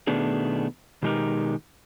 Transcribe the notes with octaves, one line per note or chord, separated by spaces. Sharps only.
B2 D#3 A3 B3 D4 G#4
B2 D#3 G#3 D#4 G4 A#4